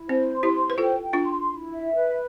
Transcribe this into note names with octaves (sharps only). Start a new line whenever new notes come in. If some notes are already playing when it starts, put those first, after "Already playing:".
Already playing: E4
C4 C5
C6
E4 G4
C5
B4
F4 A4 G5
G5
D4 F4
C6
E4
E5
B4